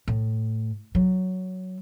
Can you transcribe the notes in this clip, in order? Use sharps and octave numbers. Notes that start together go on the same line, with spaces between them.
A2
F#3